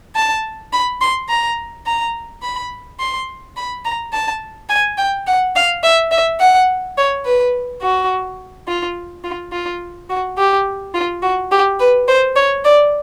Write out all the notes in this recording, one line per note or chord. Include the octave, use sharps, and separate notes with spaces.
A5
B5
C6
A#5
A#5
B5
C6
B5
A#5
A5
G#5
G5
F#5
F5
E5
E5
F#5
C#5
B4
F#4
F4
F4
F4
F#4
G4
F4
F#4
G4
B4
C5
C#5
D5